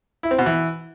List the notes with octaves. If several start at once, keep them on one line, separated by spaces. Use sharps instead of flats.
E4
C4
B2
E3